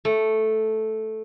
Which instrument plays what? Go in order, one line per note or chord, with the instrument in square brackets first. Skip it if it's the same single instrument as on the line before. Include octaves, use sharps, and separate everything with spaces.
[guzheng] A3